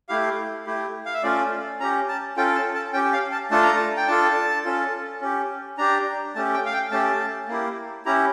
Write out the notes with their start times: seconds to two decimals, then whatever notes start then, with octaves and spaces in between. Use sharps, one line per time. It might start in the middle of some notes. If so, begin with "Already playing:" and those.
0.09 A3 E4 G4 F5
0.66 A3 E4 G4
1.06 F5
1.14 E5
1.23 A3 C#4 F4 D5
1.80 C#4 G4 A#5
2.08 A5
2.37 C#4 F4 A4 G5
2.56 A5
2.75 A5
2.93 C#4 G5
2.97 G4
3.13 F5
3.32 A5
3.51 A3 D4 F4 A4 A5
3.63 A#5
3.76 A5
3.97 G5
4.08 D4 F4 A4 A5
4.65 C#4 F4 A4
5.21 C#4 G4
5.78 D4 G4 A#5
6.35 A3 C#4 G4 A5
6.54 G5
6.66 F5
6.73 G5
6.91 A3 C#4 G4 A5
7.48 A#3 E4 G4
8.05 C#4 E4 G4 A#5